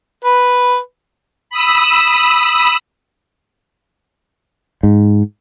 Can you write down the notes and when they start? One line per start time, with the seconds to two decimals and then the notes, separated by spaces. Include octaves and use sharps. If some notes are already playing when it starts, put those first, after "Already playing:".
0.25 B4
1.50 B5 D#6 E6
4.83 G#2